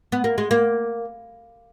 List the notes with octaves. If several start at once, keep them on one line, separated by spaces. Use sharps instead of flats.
B3
A#3
G#3
A#3